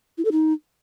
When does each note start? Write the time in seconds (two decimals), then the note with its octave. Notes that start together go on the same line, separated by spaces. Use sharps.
0.18 E4
0.25 A4
0.32 D#4